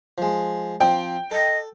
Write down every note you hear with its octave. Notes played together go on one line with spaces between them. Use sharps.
F3 G#3
F3 C4 G5
A4 D#5